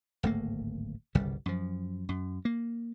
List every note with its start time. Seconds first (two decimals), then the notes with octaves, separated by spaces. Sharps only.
0.23 D1 G#1 A3 A#3
1.15 G1 C2 C#3 G3
1.46 F#2 F3
2.09 F#2
2.45 A#3